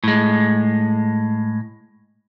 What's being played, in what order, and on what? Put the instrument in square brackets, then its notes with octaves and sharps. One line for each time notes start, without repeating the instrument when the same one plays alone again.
[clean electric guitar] A2 G#3